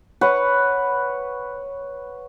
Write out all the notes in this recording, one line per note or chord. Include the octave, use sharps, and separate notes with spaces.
B4 C#5 F#5